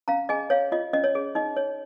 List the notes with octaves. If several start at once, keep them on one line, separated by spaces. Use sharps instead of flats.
C#4 F5 A#5
G#4 D#5 G#5
C#5 F5
F4 D#5
C#4 D#5
C#5
G#4
D#4 D#5
C#5